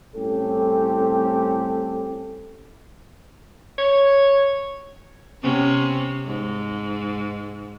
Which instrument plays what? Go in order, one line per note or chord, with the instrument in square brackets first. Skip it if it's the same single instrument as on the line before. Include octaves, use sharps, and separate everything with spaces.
[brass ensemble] A2 G3 C4 C#4 G4 A4
[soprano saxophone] C#5
[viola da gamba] C3 B3 C#4
G#2